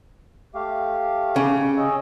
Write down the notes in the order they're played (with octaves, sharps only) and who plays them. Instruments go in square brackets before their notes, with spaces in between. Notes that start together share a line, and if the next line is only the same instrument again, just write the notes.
[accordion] A3 G4 F5
[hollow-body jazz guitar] C#3
[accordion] C#4 D#5 E6